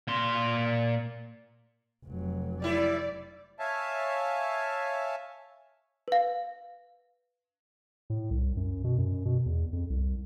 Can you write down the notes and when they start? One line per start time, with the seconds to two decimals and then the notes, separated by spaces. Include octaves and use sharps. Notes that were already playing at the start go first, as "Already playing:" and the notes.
0.08 A#2 C6
2.06 F1 F#3
2.62 G3 E4 D5
3.59 C#5 E5 F5 G#5 A5
6.08 B4 F5
8.10 A2
8.31 C2
8.57 F#2
8.84 B2
8.98 F#2
9.25 B2
9.46 E2
9.73 F2
9.90 C2